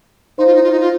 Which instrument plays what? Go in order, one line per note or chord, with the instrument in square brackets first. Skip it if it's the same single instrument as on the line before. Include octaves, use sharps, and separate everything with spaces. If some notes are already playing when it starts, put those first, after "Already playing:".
[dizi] D#4 [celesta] C5 F5 C6
[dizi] F4
D#4
F4
D#4
F4